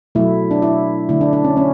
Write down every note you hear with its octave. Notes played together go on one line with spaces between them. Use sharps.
B2 F#3 A3 E4
D4
E4
D3 A3 E4
D4
D4
C#4
C#4